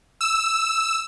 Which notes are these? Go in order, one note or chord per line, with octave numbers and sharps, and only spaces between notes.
E6